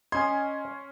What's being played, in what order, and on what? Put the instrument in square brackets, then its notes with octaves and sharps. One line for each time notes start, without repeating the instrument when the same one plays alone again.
[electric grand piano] C#4 G#6 [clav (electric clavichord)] D#5 G#5 [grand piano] C6